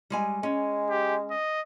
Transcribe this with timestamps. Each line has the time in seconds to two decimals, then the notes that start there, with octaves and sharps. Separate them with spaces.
0.10 G3 G#3 G#5
0.43 G#3 C#4
0.90 G4
1.31 D#5